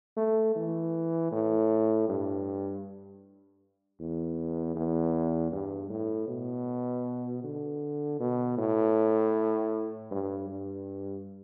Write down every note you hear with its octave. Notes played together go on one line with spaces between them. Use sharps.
A3
E3
A2
G2
E2
E2
G2
A2
B2
D3
B2
A2
G2
G2